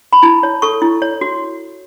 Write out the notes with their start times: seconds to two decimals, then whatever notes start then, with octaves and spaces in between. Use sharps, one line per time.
0.13 B5
0.23 E4 A5
0.43 C#5
0.62 A4 C#6
0.82 E4
1.02 C#5
1.21 F#4